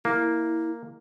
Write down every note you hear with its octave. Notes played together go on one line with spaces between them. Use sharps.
A#3 E4